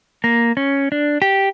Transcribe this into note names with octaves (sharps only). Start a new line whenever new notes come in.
A#3
C#4
D4
G4